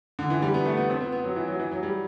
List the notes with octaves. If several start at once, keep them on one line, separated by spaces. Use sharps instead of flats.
D3
E3
G3
B3
A3
B3
C4
B3
B3
F#3
E3
F#3
E3
F#3
G3